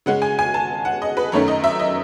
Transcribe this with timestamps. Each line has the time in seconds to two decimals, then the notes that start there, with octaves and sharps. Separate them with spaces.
0.06 C#3 G#3 C#4 F#5
0.22 G#5
0.39 G#5
0.54 A5
0.85 F#5
1.02 D#5
1.17 B4
1.32 F#2 D#3 A3 C#4 C#5
1.48 D#5
1.64 E5
1.79 D#5